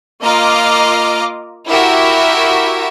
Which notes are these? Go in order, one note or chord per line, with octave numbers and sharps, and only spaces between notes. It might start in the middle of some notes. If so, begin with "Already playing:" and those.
A#3 F4 D#5 A#5 D6 F6
E4 F#4 G4 A#4 E5